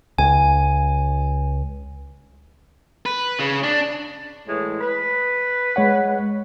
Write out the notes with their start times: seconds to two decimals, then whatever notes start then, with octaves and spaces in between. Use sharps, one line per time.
0.18 C#2 G#5
3.06 B4
3.39 C#3
3.63 D4
4.48 A2 E3 G#3
4.81 B4
5.76 G#3 C#5 F#5